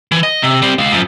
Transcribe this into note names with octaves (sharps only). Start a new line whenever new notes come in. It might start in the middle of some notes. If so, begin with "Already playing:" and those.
E3
D#5
C3
G3 C4
G#3 F5
F#2 F3